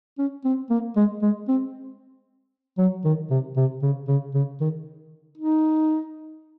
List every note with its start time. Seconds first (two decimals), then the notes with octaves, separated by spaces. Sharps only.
0.18 C#4
0.45 C4
0.70 A#3
0.96 G#3
1.22 G#3
1.48 C4
2.78 F#3
3.05 D#3
3.30 C3
3.57 C3
3.83 C#3
4.08 C#3
4.34 C#3
4.61 D#3
5.38 D#4